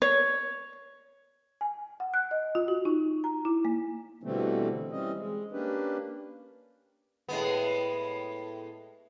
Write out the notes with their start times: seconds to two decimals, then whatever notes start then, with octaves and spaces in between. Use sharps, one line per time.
0.02 C#5
1.61 G#5
2.00 F#5
2.14 F#6
2.31 D#5
2.55 F4
2.68 F#4
2.85 D#4
3.24 A#5
3.45 E4
3.65 A#3
4.23 B2 D3 E3 G3 A3 C4
4.92 E3 G3 C4 C#4 D#5
5.15 G#3
5.52 A#3 C#4 D4 G4 B4
7.28 A2 G#3 B3